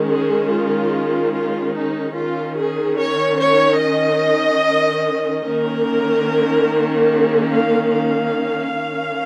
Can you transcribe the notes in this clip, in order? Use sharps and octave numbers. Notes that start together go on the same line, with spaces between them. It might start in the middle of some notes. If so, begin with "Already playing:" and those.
Already playing: D#3 G#3 C#4
G#4
F4
F4
D#4
D#3 C#4 F4
G#4
C#5
C#5
D#5
D#3 A#3 C#4 A#4
G#4
F5
F5
D#3 C#4